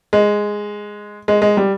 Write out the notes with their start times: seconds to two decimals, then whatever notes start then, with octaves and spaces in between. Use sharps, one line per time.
0.13 G#3
1.28 G#3
1.42 G#3
1.57 G3